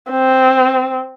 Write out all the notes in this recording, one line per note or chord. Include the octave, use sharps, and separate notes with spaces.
C4